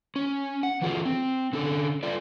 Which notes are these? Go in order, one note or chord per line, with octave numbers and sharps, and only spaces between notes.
C#4
F#5
E3 F#3 F4 G#4 A4
C4
D3 C#4 A4
F4 A4 D5